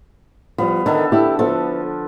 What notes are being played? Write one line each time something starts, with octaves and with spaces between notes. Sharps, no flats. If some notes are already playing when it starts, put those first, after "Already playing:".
F3 G3 B3
D3 D#3 A4 E5
E4 G4
F3 B3 A4